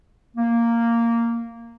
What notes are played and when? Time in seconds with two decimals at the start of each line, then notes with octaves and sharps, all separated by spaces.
0.36 A#3